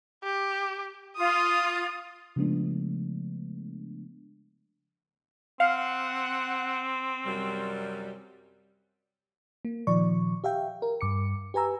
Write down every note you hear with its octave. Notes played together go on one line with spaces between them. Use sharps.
G4
F4 D#6
C#3 F3 G#3 A3 B3 D4
C4 F5 F#5
F#2 C3 G3
A#3
A#2 D#3 F3 D5 C#6
G4 E5 F5 G5
A#4
G2 D6 C#7
G4 B4 G#5 A#5 E6